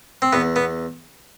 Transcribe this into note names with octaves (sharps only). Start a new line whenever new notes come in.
C4
E2 B3
B3